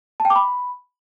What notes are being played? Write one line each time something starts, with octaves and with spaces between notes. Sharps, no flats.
A5
G5
D6
B5